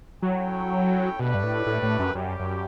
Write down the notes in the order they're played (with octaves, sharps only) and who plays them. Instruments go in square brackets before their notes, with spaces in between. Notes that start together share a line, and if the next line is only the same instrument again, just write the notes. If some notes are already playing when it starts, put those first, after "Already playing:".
[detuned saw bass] F#3 [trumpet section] C#4 E4 A4 C#5 G5
[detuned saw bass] B2 [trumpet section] A3 D4 G4 B4 D5
[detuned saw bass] G2
A2
A2
A2
F#2
[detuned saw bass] F#2 [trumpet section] G3 C#4 G4
[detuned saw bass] F#2